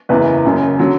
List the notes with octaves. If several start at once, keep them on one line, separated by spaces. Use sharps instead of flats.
F#1 E2 C#3 E3 B4
F#1 F#2 C#3
D3 F#3